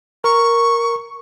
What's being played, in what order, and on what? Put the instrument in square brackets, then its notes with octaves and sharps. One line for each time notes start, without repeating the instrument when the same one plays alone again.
[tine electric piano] A#4 [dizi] C#6